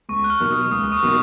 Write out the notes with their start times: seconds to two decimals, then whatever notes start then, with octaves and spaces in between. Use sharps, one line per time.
0.09 C#2 C#6
0.24 F#6
0.30 F6
0.40 B2 F#3 A#3 D#4
0.51 D#6
0.71 C#2 D#6
0.92 C#6
1.02 B2 F#3 A#3 D#4